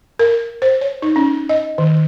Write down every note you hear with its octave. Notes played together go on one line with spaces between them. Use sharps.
A#4
C5
C#5
D#4
C#4
D#5
D#3